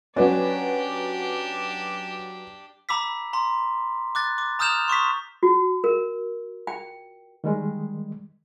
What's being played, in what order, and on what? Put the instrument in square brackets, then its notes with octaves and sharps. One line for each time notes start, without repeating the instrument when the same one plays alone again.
[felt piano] F#3 B4 D5 [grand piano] C#4 [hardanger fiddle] D4 G4
[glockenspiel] A#5 B5 D6 E6 B6
A#5 C6
D6 F#6 A6
D6
A#5 D#6 F6 G6 E7 F7
C6 C#6 D#6 B6
[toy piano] F#4
A#4
G5
[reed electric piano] D#3 G3 G#3